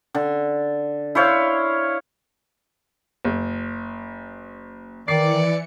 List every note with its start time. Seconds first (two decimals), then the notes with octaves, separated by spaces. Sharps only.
0.15 D3
1.15 E4 C5 C#5 F5
3.25 F#1
5.08 D#3 E3 D5 C7 C#7